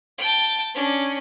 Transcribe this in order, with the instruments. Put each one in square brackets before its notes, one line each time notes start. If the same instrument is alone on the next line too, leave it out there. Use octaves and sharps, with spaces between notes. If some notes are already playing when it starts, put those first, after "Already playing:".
[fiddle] G5 A5
C#4 D4